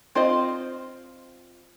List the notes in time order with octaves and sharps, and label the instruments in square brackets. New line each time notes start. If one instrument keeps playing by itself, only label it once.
[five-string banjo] C4 F4 C5 D#5